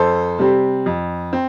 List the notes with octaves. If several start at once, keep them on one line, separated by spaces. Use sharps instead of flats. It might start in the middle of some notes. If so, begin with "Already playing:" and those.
Already playing: F2 A4 C5
C3 G3 C4
F2
C4